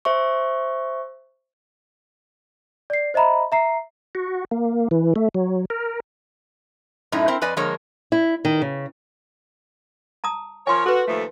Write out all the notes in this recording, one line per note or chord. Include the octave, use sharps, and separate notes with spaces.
C5 E5 C#6
D5 C7
C5 D#5 E5 A#5 B5
E5 A#5 C7
F#4
A#3
E3
A3
F#3
A#4
F#2 A2 D#4 E4
C4 E4 A#4 C5
F2 B4 D5 D#5 G#5
D3 F3 G#3 A#3 A#4 C#5
E4
D#3
C#3
A5 A#5 D#6
F3 A#4 C#5 G#5 C6
F#4 A4 B4
D#2 F3 A3